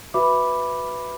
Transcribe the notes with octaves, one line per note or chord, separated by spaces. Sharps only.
F#4 B4 E5 B5 D6